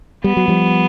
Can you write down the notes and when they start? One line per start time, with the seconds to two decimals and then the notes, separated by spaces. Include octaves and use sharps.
0.24 G3 B3
0.37 F#3
0.48 F3 G3